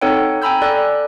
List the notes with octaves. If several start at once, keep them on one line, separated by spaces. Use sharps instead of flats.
C4 D#4 A4 C#5 F#5 G5
G5 G#5 A#5 B5 E6 G6
A4 D5 F#6